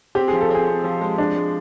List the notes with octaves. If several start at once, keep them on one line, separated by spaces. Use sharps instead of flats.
C4 G4
G#4
F3
A4
C4 G#4
C4
F3
G#3
G#3 D4
G#3